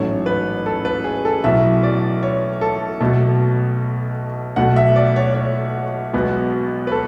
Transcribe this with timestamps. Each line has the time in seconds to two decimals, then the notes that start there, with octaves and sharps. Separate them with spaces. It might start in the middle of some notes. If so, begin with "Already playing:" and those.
Already playing: A1 G#2 F#3 A3 C#5
0.26 B4
0.66 A4
0.85 B4
1.04 G#4
1.25 A4
1.44 B1 A2 F#3 E5
1.83 D5
2.23 C#5
2.61 A4
3.00 B1 B2 A3 A4
4.56 B1 B2 A3 F#5
4.76 E5
4.96 D5
5.16 C#5
5.35 C#5
6.13 B1 B2 G#3 B3
6.87 B4
6.91 A4